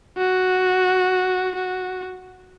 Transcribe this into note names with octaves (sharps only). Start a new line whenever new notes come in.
F#4
F#4